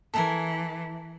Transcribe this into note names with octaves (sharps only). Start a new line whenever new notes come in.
E3 A4 A#4 G#5